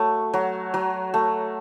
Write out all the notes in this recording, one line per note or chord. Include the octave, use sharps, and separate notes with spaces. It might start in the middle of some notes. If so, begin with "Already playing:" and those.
Already playing: F#3 A3
F#3
F#3
A3